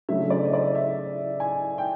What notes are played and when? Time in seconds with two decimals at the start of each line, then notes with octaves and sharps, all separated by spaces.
0.09 C#3 F#3 A3 D4 E5
0.30 D5
0.45 D#5
0.53 D5
0.75 E5
1.40 G#5
1.78 G5